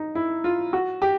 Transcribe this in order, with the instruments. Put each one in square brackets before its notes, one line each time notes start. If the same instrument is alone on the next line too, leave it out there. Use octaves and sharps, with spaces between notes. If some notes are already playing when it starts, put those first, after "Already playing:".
Already playing: [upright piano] D#4
E4
F4
F#4
G4